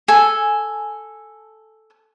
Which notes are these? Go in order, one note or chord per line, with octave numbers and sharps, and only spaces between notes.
A4 G#5